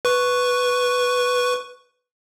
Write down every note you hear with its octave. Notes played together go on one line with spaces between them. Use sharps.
B4 C#6